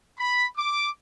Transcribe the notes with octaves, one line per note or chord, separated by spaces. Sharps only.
B5
D6